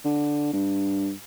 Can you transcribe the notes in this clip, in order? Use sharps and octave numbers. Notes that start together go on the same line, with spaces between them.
D3
G2